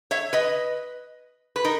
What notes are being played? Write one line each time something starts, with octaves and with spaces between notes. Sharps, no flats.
C#5 E5
B4 D#5
B4
D#4 A#4